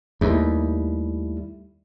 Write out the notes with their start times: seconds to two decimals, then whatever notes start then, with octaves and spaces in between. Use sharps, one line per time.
0.21 D#2 G3 A3 E4